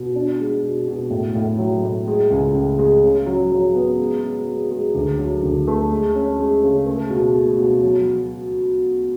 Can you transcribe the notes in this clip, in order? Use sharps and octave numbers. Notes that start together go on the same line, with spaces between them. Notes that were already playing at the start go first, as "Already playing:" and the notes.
Already playing: B2
D4
G#3
B2
B2
A2
A2
F#3
A2
G#3
C#2
C#2
G#3
C#3
F#3
F#3
B3
G#3
G#3
G#3
G#3
D2
F#3
D2
A3
G#3
C#4
G#3
C#3
A3
B2
A3
B2
F#3
F#3